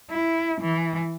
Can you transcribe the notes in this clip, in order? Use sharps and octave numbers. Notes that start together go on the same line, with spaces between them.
E4
E3